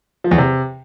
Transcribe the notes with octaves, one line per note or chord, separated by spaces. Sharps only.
F3
E2
C3